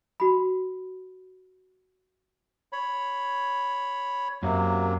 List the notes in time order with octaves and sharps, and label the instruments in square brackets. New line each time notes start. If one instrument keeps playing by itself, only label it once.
[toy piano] F#4 B5
[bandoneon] C#5 B5
[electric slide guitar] F#2 [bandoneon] C3 F#3 A#3